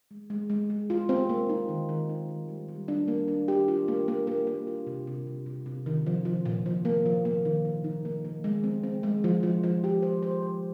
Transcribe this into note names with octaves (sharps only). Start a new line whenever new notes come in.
G#3
G#3
G#3
G#3
F4
C4
A#3
D#4
D#3
D#3
D#4
D#3
G3
G3
D4
A#3
D4
G4
F4
A#3
A#3
A#3
A#3
F4
C3
C3
C3
C3
C3
D#3
F3
F3
A#2
F3
A#3
F3
A#3
D#3
D#3
D#4
A#3
A#3
G#3
C4
C4
G#3
F3
F3
F3
G4
C5
C5
C5